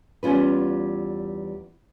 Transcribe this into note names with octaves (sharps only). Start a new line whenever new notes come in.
E2 G3 C#4 F4 B4